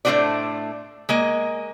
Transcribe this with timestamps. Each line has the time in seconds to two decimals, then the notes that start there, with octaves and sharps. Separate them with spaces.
0.05 A2 A3 D4 F#4 C5 D5
1.09 G#3 A#3 D#5